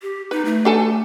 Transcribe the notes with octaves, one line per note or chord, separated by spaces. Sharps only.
G4
D#4 B4
A3
D4 A4 G#5